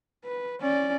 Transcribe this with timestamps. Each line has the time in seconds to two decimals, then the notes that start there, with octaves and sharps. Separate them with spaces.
0.24 B4
0.61 C#4 D5